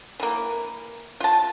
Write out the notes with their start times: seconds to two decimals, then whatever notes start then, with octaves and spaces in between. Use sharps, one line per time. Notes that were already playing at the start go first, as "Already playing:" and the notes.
0.19 E3 A#3
1.20 F4 A5